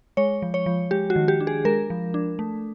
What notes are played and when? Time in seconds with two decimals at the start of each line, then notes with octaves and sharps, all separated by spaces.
0.17 G#3 C#5
0.42 F3
0.54 C#5
0.66 F3
0.91 G#3 G4
1.10 F#4
1.16 D#3
1.28 G4
1.40 D4
1.47 G#4
1.65 G#3 A#4
1.90 F3
2.14 D4
2.39 A3